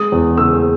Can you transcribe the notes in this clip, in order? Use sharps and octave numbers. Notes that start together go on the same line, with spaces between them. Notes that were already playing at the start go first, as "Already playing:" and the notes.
Already playing: G#3 D#6
E2
C#3 E6